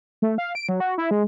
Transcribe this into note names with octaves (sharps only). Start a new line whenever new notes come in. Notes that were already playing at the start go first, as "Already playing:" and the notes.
A3
F5
D7
F#3
F#4
E4
G#3